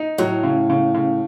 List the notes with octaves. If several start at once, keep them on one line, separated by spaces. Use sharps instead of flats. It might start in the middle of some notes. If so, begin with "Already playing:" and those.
Already playing: D#4
A2 F#3
C#3
C#3
C#3